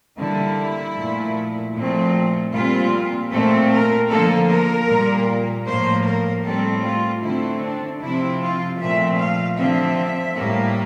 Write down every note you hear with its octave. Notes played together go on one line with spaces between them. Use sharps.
D3 G3 A#3 E4
A#2 F3 A3
A#2 F3 A3 C4
A#2 G3 C4 F4
A#2 A3 C4 A4
A#4
D3 F3 A#3 A4
A#4
A#2 G3 A#3
A2 F3 A#3 C5
A#4
A2 G3 C4 A4
F4
D3 A3 C4 E4
D4
C3 F3 C4 E4
F4
A#2 F3 A3 C4 E5
F5
D3 F3 C4 E5
A2 G3 A#3